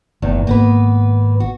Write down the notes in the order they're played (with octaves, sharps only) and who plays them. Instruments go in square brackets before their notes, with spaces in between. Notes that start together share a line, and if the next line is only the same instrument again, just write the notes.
[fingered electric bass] F#1 [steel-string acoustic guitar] E2 A2 D#3
[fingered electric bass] G#1 [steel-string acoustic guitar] A#3 B3 B4
[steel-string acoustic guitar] F#4